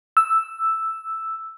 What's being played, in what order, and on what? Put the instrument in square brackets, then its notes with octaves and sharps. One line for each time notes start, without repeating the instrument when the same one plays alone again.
[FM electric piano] E6